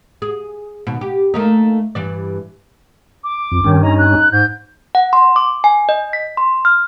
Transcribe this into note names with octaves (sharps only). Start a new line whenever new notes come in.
G#4
D#2 B2
G4
A3 A#3 D#4
G2 E3 D5
D6
F2
G2 D#3 C#4
D#4 A#5
F#6
G#2 G6
F#5
C6
D6
G#5
D#5
B6
C6
F6